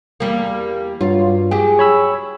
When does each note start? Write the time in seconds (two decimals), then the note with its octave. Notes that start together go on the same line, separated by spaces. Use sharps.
0.20 E2 G3 A#3
1.01 G2 F#3 F4
1.51 F#3 G4 G#4
1.79 C#5 B5 E6